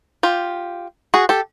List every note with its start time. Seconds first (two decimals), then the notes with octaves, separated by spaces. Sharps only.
0.23 F4 G4
1.14 F#4 G#4
1.29 G4 A4